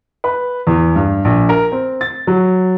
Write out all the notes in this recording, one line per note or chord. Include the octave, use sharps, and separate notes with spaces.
B4
E2
G2
A#1
A#4
C4
A6
F#3